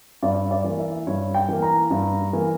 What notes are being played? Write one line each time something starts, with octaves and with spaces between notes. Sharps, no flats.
G2 D5
D5
E3 A#3
E5
G2 C#5
G5
E3 A#3
A#5
G2
E3 A#3